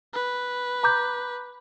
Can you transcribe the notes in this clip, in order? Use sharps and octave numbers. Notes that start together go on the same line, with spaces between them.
B4
A#5 D6 G6